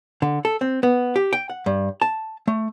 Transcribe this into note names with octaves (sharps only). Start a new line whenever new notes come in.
D3
A4
C4
B3
G4
G5
F#5
G2
A5
A3